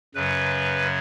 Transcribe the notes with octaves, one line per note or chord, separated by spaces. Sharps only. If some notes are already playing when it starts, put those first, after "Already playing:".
F#2 C#3 F#3 B4